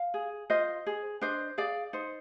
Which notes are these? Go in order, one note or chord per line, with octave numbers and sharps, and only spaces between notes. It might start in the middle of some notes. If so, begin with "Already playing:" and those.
Already playing: F5
G#4
F4 C5 D#5
G#4
D4 C5 D#5
G#4 D5 F5
D#4 C5